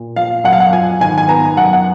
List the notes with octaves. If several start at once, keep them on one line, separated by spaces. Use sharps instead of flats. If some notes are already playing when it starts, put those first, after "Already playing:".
Already playing: A#2
F3 F5
F#2 F#5
F5
F#5
F3 G#5
G#1 G#5
G#5
B3 A#5
F#2 F#5
F#5